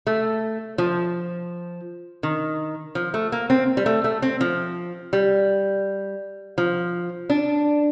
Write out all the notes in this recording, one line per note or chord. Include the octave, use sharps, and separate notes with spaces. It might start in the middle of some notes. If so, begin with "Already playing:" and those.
A3
F3
D#3
F3
A3
A#3
C4
G3
A3
A3
C4
F3
G3
F3
D4